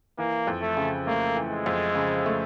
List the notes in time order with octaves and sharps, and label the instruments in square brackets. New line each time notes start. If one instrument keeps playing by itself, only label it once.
[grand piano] E3 [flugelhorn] A#3
[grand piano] F2
[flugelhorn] A3
[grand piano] C#3
[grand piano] A3 [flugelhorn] A#3
[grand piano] E3
[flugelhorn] G#3
[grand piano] F2
C#3
A3